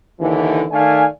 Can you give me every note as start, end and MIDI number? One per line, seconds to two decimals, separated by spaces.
0.20 0.64 39
0.20 0.64 50
0.20 0.64 52
0.71 1.05 51
0.71 1.05 57
0.71 1.05 74
0.71 1.05 77
0.71 1.05 80